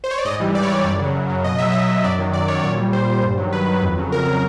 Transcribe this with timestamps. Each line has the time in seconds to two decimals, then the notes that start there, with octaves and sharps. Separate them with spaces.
0.04 C5
0.11 C#5
0.18 D5
0.25 G#2 D#5
0.40 E3 G3
0.55 G#2 D5
0.63 C#5
0.70 E3 G3 D5
0.85 F#2
0.99 C#3 F#3
1.14 F#2
1.29 C#3 F#3
1.44 B2 D#5
1.58 F#3 E5
1.72 B2 D#5
1.89 F#3
2.04 F#2 D5
2.19 D#3 F#3
2.33 F#2 D5
2.48 D#3 F#3 C#5
2.63 A#2 C#5
2.78 G3
2.93 A#2 C5
3.08 G3
3.23 G2
3.37 D#3 F#3
3.52 G2 B4
3.67 D#3 F#3
3.82 F2
3.97 C#3 F#3
4.12 F2 A#4
4.27 C#3 F#3